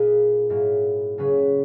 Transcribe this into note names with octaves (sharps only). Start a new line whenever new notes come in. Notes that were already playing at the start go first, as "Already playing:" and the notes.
Already playing: A#2 A#3 D#4 G#4 B4
G#2 F#3 A#3 E4
C#3 F#3 C#4 G#4 B4